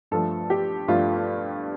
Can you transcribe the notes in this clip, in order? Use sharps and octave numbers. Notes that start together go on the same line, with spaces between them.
G2 F3 A3 A4
G4
G2 F3 A3 F4